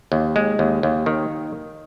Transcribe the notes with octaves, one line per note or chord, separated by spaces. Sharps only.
D#2
G#3
D#2
D#2
D#3